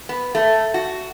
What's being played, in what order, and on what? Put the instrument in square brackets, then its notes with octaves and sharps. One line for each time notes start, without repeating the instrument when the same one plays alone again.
[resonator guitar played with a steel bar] B3
A3
F#4